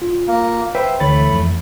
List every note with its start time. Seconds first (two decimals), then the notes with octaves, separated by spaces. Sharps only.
0.02 F4
0.28 A#3
0.75 B4 C5 E5 G5
1.00 D2 E3 A3 C#5 B5 A6
1.32 F2